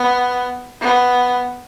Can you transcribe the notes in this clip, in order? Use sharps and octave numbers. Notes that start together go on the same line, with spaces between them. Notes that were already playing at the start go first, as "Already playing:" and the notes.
Already playing: B3
B3